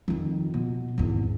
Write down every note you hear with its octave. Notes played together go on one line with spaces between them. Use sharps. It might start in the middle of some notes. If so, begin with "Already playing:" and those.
F2 D#3
B2
G#1 E2